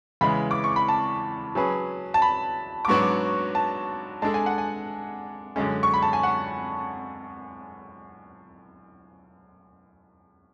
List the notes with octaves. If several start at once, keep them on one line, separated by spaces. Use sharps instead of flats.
E2 C#3 E3 G#3 B5
D6
C#6
B5
A5
F#3 C#4 G#4 B4
A5
B5
D6
G#2 F#3 B3 D4 F#4 C#6
A5
G#3 D4 A4 A5
G#5
F#5
G#5
F#2 D3 G#3 C#4
C#6
B5
A5
G#5
F#5